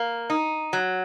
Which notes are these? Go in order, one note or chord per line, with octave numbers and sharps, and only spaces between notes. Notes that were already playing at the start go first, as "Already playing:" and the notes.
Already playing: A#3
D#4
F#3